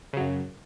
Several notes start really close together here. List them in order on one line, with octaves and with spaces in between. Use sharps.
C#3 F#3 F#2